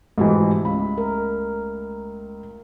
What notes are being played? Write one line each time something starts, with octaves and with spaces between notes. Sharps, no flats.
G#2 B2 E3 A3 G4
C#2 B5
A#4